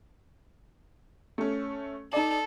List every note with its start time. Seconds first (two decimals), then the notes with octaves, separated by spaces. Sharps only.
1.38 A3 C#4
2.13 D#4 A4 D5